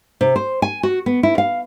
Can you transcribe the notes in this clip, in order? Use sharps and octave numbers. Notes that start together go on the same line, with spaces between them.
C3
C5
G#5
F#4
B3
E4
F5